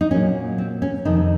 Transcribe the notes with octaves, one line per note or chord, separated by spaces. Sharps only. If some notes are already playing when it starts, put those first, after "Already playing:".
D#4
A#2 F#3 A#3 C#4
C4
C#4
F2 C3 D#3 D#4